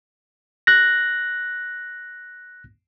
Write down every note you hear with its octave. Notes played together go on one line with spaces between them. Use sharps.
F#6 A#6